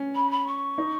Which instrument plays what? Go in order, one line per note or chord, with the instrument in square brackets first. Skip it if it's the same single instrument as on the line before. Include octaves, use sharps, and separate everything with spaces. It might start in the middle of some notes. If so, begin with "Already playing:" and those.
Already playing: [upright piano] C#4
[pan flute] B5
B5
C#6
[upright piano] D#4